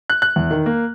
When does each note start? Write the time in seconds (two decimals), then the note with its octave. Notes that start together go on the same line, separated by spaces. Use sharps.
0.10 F#6
0.22 F#6
0.36 E2
0.51 D#3
0.66 A#3